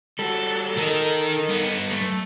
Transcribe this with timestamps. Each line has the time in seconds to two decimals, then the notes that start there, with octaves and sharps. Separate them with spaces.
0.19 G3 F#4 A4
0.77 D#3 D#4 A#4
1.49 G2 B3
1.91 A3